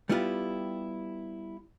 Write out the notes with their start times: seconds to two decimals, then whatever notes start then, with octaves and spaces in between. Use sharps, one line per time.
0.09 G3 B3 E4 F4 G4